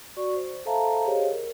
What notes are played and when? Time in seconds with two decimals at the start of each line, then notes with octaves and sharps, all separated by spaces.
0.17 F#4 D5 C#6
0.35 C5
0.65 A4 C5 E5 F5 A5 A#5
1.05 G4 G#4 C5 C#5 D#5 F5
1.31 A#4